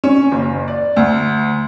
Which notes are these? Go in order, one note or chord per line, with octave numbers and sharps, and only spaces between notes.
C#4
F#1
D5
D2